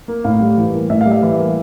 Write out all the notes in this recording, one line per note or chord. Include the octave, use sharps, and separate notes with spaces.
A#3
A2 F5
G3
E3
A#3
A2 E5
F5
G3
E5
E3
A#3